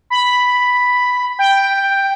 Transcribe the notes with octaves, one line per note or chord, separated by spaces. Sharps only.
B5
G5